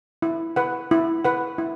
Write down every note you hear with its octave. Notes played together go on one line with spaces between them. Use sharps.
E4
B4 F#5
E4
B4 F#5
E4